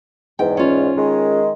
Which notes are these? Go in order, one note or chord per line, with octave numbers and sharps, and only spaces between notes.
E2 G#2 G5
C#4 F4
D#3 G#3